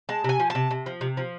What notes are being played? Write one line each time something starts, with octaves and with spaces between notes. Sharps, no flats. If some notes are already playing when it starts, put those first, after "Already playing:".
G#3 A5
C3 G#5
F3
A5
C3
C3
F3
C3
F3